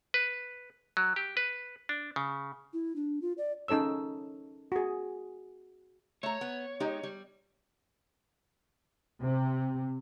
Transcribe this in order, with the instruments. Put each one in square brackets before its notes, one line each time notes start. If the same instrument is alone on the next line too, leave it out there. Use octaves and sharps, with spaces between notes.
[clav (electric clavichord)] B4
F#3
G4
B4
D4
C#3
[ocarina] E4
D4
F4
D5
[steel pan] C#4 D#4 A4 C#5 E6
F#4 G#4
[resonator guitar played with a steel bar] A3 A#5 [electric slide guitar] C#5
[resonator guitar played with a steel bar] B3
G#3 D#4 G4
G3
[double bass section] C3